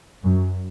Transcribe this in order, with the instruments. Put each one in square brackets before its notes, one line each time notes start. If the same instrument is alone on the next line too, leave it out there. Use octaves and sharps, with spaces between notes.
[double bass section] F#2